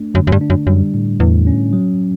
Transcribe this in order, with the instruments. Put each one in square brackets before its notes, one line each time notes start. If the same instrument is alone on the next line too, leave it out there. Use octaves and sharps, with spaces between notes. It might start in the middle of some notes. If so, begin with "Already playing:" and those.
Already playing: [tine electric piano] A3 D4
[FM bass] F#2 [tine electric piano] D3
[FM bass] F#2
G2
[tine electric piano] D4
[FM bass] F#2
[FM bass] F#2 [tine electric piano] G3
[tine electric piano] A2
[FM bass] E2 [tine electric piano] A2
[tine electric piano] C#4
F#3